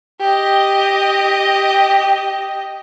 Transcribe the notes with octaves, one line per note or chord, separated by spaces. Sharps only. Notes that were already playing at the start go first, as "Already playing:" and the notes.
G4 D#5